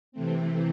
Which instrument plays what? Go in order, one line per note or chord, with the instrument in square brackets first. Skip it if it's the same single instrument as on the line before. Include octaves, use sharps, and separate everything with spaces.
[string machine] C3 E3 A3 C4